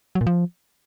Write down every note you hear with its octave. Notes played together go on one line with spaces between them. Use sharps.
F#3
A#2
F3